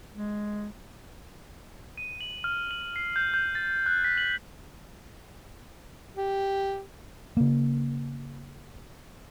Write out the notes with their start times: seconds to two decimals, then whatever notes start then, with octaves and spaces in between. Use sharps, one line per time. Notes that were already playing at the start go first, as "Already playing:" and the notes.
0.14 G#3
1.98 D#7
2.21 F#7
2.44 F6
2.71 F#7
2.96 C7
3.16 G6
3.34 G6
3.55 A6
3.86 F#6
4.04 B6
4.18 F#7
6.17 G4
7.37 C#3 A#3